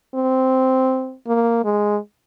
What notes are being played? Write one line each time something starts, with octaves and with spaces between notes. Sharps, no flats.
C4
A#3
G#3